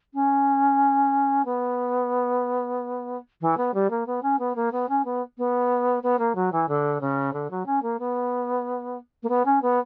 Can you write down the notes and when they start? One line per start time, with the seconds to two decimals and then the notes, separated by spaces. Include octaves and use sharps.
0.14 C#4
1.45 B3
3.41 E3
3.57 B3
3.74 G3
3.90 A#3
4.07 B3
4.23 C#4
4.39 B3
4.56 A#3
4.72 B3
4.89 C#4
5.05 B3
5.38 B3
6.03 B3
6.19 A#3
6.35 F#3
6.52 E3
6.69 D3
7.01 C#3
7.33 D3
7.51 F#3
7.66 C#4
7.82 A#3
7.99 B3
9.23 A#3
9.29 B3
9.46 C#4
9.62 B3